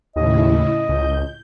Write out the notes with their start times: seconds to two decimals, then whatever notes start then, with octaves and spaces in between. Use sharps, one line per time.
0.16 D#2 A2 C#3 E4 D#5
0.89 C#2 G6